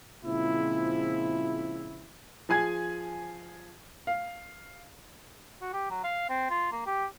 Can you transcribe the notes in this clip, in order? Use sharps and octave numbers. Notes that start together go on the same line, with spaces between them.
A#2 C#3 F3 G#3 C4 E4
F3 G#4 G#5 G#6
F5
F#4
G4
F#3
F5
C4
F4
A#3
G4